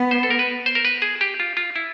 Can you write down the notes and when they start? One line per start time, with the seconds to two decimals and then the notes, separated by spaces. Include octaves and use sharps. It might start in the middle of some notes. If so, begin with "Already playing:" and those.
Already playing: B3
0.11 C5
0.23 A4
0.30 A#4
0.39 B4
0.66 C5
0.75 A#4
0.85 B4
1.02 G#4
1.21 G4
1.40 F4
1.57 F4
1.76 E4